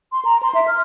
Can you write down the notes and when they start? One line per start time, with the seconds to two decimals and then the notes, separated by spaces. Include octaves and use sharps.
0.12 C6
0.25 A#5
0.43 C6
0.55 E5
0.67 F6